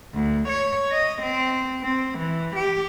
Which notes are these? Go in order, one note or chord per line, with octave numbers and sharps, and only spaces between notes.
D2
C#5
D#5
C4
C4
E3
G4